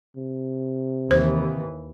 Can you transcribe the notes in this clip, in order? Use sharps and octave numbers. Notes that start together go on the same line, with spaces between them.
C3
D#2 E3 C5